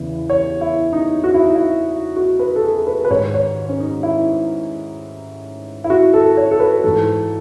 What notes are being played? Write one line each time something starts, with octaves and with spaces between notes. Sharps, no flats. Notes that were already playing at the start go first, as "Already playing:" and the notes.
Already playing: E2 C#3 E3
C#5
E4
D#4
F#4
E4
D#4
E4
F#4
B4
A4
G#4
B4
B4
G#2 D#3 C#5
C#5
C#4
D#4
E4
E4
F#4
A4
C#5
A4
B4
G#2 E3 A4